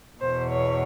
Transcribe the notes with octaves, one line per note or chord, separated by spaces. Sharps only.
E2 B2 C5
C#5